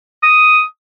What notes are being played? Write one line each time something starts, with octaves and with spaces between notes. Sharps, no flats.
D#6